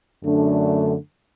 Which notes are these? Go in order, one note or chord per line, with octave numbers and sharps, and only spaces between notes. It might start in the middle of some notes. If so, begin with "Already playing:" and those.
F#2 D3 A3 D4